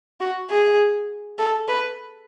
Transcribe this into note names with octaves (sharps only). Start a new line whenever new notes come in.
F#4
G#4
A4
B4